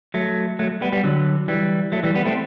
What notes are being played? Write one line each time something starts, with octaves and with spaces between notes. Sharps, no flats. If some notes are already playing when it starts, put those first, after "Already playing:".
F#3 A3
F#3 A3
G3 B3
G3 B3
D3 F#3
E3 G3
F#3 A3
E3 G3
G3 B3
A3 C4